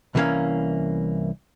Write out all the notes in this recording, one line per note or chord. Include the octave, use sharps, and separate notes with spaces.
C2 E3 F#3 A#3 C#4 F5